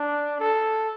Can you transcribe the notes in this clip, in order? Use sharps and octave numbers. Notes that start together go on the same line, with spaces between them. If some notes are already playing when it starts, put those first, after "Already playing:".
Already playing: D4
A4